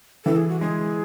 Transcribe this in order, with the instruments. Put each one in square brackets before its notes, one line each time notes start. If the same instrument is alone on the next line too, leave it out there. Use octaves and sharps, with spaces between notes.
[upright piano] E3 [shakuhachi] A4
[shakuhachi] G#4
F#4
[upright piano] G#3 [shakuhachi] G#4